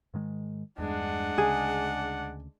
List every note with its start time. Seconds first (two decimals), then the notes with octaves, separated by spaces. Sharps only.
0.14 G#2 D#3 G#3
0.78 E2 G2 G#3 D4 F#5
1.38 D2 C#3 G#4